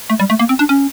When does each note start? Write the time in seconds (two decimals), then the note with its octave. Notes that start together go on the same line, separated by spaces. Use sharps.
0.10 A3
0.20 G3
0.30 A3
0.39 A#3
0.49 C4
0.59 D4
0.69 C#4